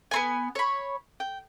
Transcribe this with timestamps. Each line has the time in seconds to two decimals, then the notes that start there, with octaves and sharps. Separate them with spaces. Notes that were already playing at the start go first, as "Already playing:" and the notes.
0.11 B3 C4 G#5
0.55 C#5 B5
1.20 G5